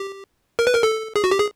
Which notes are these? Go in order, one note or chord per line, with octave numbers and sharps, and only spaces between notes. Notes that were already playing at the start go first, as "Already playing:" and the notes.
Already playing: G4
A#4
B4
A#4
A4
G#4
F#4
G4
G#4